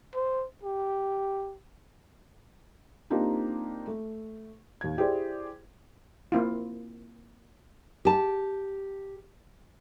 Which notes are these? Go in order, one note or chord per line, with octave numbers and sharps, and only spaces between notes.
C5
G4
A#3 C4 D4 D#4 F4 G4
A3
D#2 G#6
E4 G4 G#4 C5 D5
A#3 C4 E4 F4
G4 A5